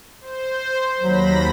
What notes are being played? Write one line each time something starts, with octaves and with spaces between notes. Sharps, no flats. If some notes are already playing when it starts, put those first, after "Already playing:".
C5
D#2 F#3 B5 A#6